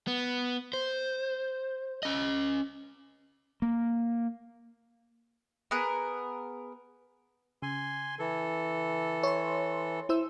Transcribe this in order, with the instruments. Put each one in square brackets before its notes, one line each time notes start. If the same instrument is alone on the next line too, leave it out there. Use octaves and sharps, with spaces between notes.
[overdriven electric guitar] B3
C5
C#4 D#5
[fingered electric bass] A#3
[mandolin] B3 G#4 A#4 F#6
[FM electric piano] C#3 [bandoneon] G#5 C6
[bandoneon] E3 A4
[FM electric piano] C#5 C6
E4 C5 E6